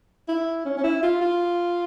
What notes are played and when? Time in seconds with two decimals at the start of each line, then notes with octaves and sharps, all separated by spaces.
0.29 E4
0.65 C#4
0.77 C#4
0.84 E4
1.03 F4
1.21 F4